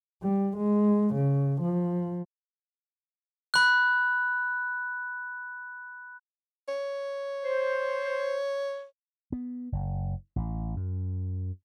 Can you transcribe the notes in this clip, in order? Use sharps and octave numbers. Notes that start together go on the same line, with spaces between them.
G3
G#3
C#3
F3
B5 F#6
C#5
C5
B3
F#1
A1
F#2